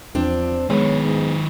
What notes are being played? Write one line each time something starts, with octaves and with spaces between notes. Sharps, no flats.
E2 F3 C4 D4
D#3 G#3 B3 B4 C#5
G#2